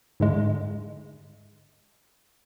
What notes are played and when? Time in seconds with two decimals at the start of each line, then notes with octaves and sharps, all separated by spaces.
0.20 G#2 D3 G#3